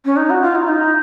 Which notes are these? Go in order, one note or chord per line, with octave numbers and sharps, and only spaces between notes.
C#4
D#4
F#4
F4
D#4
F4
D#4